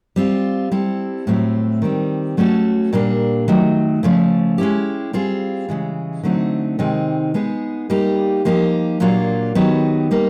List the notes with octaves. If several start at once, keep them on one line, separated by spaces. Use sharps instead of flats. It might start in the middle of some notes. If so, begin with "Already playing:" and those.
G3 C4 F4
G3 C4 E4 A4
A2 F#3 A3 C4
D#3 G3 C4
F#3 A3 C#4 F#4 A4
A#2 G3 A#3 D4
D#3 F#3 A3
C#3 F3 A3
G#3 C#4 E4 G4
G3 C4 F4 G#4
C#3 E3 G#3
D3 F#3 A3 C4 D#4
C3 D#3 G#3 C4 D#4
G#3 B3 D#4 G#4
G3 A#3 D#4 G4
F3 A#3 D#4 G4
A#2 F#3 A#3 D4 F4
D#3 F#3 B3 D#4 G4
G3 A#3 D#4